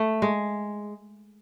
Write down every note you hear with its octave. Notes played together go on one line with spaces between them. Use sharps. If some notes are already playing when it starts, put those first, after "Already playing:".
Already playing: A3
G#3